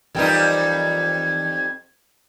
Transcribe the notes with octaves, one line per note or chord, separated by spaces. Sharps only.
F2 E3 G3 D#4 A#4 G5 G#6